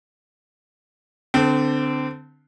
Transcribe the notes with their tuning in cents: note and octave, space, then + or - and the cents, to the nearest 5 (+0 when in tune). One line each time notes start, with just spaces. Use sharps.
D3 +0 C4 -25 C5 +15